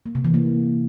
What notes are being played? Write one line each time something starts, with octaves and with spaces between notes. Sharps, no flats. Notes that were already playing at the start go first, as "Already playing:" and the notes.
A#3
C3
E3
A#3